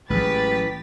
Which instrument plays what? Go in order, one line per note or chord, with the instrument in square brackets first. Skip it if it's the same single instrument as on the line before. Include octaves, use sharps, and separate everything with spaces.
[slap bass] A1 [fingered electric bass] F#3 G#3 [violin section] G4 A6 B6 [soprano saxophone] B4